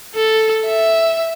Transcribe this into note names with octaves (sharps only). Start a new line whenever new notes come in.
A4
E5